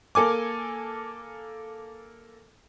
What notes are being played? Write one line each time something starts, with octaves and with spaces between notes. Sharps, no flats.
A#3 A4 G#5 D6